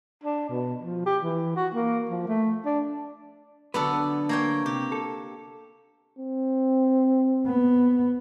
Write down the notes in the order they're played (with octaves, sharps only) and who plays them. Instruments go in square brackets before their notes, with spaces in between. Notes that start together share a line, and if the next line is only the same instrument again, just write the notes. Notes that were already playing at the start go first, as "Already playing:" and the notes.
[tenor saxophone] D4
B2
F3
G4
E3
F#4
A#3
F3
A3
D4
[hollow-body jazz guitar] D3 F#3 B4 [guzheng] B3 D4 A4
[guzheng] A#3 C#5 G5
[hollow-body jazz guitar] C3 [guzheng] G4
[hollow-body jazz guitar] A4
[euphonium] C4
[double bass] B3